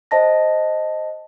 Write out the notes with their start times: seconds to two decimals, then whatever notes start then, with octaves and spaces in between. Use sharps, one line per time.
0.11 C5 D#5 A5 A#6